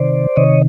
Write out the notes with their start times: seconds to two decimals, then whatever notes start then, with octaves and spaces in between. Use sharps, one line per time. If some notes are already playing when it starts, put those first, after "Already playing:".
Already playing: C3 D#3 C5 D5
0.36 C3 D#3 C#5 D#5